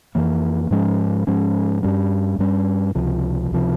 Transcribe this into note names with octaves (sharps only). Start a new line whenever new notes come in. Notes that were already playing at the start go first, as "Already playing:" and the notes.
F2 E3 A#3
G#2 F3 G#3 C#4
G#2 F3 G#3 C#4
G2 G3 C#4
G2 G3 C#4
C#2 C3 F3
C#2 C3 F3